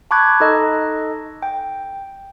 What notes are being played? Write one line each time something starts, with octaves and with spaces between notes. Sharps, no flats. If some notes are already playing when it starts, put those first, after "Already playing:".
A5 B5 C#6 D6 F#6 G#6
D#4 A4 D#5
G5